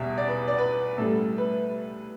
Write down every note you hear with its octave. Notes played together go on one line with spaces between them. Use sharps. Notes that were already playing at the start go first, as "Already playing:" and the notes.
Already playing: E2 B2 G3 E5
D5
B4
D5
B4
A2 G3 A4
B4